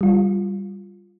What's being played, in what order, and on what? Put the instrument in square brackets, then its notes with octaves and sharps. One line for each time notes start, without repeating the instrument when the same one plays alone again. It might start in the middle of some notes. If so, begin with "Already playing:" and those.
[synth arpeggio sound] G3 F4